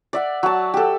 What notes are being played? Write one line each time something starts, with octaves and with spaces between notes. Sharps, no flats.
D5 E5 F#5
F#3 A5
G4 A4